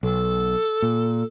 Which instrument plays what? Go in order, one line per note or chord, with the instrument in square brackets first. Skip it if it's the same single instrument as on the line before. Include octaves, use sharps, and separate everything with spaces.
[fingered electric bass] B1 [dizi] A4
[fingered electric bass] A#2